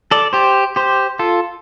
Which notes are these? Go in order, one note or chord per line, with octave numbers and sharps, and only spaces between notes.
A4 D5
G4 C5
G4 C5
F4 A4